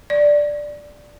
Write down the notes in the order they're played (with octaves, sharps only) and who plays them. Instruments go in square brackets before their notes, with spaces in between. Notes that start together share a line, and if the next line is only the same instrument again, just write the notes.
[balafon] D5